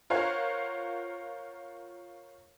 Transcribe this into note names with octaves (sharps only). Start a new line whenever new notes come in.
F4 A#4 C5 C#5 F5 F#5